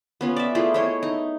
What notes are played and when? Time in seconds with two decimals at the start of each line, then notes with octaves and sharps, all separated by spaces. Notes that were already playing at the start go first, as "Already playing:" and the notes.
0.21 B3 C#4 F4
0.36 D5 E5
0.55 A3 E4 F4 G#4
0.74 E4 C#5 D#5
1.03 D#4